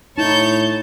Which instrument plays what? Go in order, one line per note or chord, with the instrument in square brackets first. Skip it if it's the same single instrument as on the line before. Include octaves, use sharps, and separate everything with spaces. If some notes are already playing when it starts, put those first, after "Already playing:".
[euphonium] A2 [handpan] D#4 E4 [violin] C#5 G6 [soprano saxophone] A5